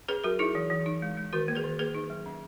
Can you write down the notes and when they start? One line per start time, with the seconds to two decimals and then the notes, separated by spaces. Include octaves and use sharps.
0.08 C#4 G#4 B4
0.24 F#3 F#4 A#4
0.39 D#4 E4 G#4
0.55 E3
0.70 E3
0.86 D#4
1.02 G#3
1.17 G#3
1.33 D#3 F#4 A#4
1.48 A#3
1.55 G#4 B4
1.64 D#3
1.79 A#3 G#4 B4
1.95 D#4
2.10 F#3
2.26 C#4